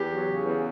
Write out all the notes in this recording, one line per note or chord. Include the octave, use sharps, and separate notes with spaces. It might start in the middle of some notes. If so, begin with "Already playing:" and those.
Already playing: E2 G4
F#3
C#3
E2